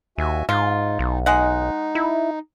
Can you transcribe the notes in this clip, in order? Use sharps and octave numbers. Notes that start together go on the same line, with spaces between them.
D#2 F#4 E5 G#5
G#2 D#4 F4
B1
G#3 D#4 F#5
E4